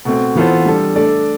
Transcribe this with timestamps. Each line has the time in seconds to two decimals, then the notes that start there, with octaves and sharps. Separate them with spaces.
0.05 B2 A3 C4
0.36 E3 B3 F4 A4 C5
0.66 G3 D4 A4
0.96 A3 D4 A4 D5